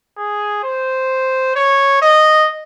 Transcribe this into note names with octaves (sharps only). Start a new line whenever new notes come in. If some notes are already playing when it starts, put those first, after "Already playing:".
G#4
C5
C#5
D#5